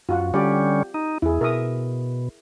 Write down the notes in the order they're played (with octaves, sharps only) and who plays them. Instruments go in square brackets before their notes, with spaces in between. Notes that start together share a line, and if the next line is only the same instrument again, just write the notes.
[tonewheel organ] F#2 [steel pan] F4 F#4 F#5
[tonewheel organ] D3 G3 C#4 [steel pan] G4 D5
[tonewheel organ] D#4
[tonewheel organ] E2 [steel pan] E4 G#4
[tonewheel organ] B2 [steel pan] A#4 E5 D#6